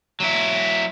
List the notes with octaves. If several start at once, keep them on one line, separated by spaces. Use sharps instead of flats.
F#3 E4